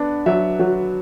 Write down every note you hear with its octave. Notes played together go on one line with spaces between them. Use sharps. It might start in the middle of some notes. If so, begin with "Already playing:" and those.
Already playing: B3 D4
F#3 E5
F#3